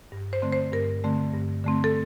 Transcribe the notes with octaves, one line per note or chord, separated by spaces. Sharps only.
G2
C5
D3 A3 C4
C5
G2 A#4
D3 A3 C4
G2
D3 A3 C4
A4